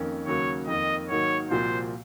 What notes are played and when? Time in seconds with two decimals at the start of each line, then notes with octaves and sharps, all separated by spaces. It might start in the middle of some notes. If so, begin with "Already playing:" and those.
Already playing: F2 D#3 A#3 C#4
0.26 D#2 C#3 F#3 A#3 C#5
0.67 F2 D#3 A#3 D#5
1.09 G#2 D#3 F#3 A#3 C#5
1.50 C2 A#2 F3 C4 F#4 C5